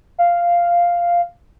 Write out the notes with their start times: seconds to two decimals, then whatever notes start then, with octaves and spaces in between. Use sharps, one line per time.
0.18 F5